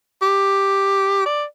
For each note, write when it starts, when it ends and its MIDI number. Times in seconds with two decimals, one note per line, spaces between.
0.22 1.23 67
1.26 1.44 74